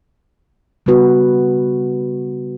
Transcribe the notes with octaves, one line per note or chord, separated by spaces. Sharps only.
C#3 G3 B3 F#4 B4